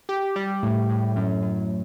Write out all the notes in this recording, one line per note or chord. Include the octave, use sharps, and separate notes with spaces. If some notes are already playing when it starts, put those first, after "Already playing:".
G4
G3
A2
A2
F#2
F#2